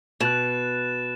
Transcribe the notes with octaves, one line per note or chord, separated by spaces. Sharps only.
B2 F#6 A6 E7